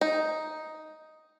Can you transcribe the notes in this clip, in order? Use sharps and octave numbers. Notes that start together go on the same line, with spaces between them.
D#4